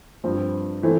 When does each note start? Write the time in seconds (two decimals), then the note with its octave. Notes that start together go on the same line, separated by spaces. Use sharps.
0.24 G2 F3 C4
0.83 E3 A3 C4